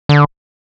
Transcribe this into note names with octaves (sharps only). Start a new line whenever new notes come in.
D3